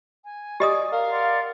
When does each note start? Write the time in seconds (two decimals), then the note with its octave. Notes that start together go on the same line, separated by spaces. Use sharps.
0.23 G#5
0.60 G4 D5 D#5 D#6
0.92 A#4 F5
1.10 D5 F#5 C6